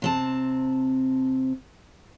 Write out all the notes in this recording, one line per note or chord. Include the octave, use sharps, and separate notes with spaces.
C3 C4 A5